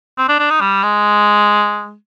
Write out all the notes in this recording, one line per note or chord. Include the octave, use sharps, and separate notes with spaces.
C4
D4
D4
D#4
G3
G#3